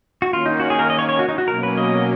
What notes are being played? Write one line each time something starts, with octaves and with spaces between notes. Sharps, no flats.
F#4
D#3 A#3 C#4 F4
D#4
F#4
G#4
A#4
D#5
C#5
C#5
F#4
D#4
F#4
B2 F#3 A#3 C#4 A#4
B4
D#5